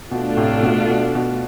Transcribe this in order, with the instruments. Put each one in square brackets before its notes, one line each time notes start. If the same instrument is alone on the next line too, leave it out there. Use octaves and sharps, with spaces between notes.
[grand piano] B2 [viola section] A3 D4 F4
[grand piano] A2 C3
B2
B2
B2